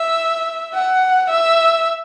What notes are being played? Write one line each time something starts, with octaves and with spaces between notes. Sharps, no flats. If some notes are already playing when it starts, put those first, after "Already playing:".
Already playing: E5
F#5
E5